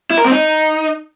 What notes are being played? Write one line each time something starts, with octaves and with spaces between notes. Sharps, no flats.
E4
A#4
C4
D#4